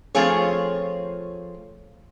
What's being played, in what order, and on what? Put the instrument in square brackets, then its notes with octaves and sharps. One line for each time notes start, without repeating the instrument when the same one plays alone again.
[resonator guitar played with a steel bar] F3 A3 C4 F4 G#4 C#5